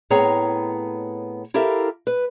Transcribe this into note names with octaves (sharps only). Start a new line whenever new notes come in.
A2 B3 C4 G#4 C#5 A#5
E4 G4 A4 A#4 E5 F5
B4